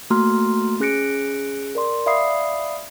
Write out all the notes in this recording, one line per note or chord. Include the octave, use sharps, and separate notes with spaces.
A3 A#3 F#4 A#5 C6 F6
C#4 G#4 F#6 A#6 C#7 D7
A#4 D5 C6
D5 E5 F5 B5 D#6 C7